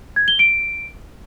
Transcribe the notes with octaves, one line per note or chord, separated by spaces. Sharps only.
G#6
G7
D7